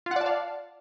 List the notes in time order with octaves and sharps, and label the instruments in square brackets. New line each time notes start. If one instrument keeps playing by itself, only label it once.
[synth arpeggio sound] F4
F#5
D5
A5
F5